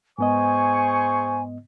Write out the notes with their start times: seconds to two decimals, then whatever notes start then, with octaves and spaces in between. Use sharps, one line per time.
0.18 G#2 B3 G#4 C5 D#5 G#5 C#6